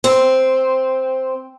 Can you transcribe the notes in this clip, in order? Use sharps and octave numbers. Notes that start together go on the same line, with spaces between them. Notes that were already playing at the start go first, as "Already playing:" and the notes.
C4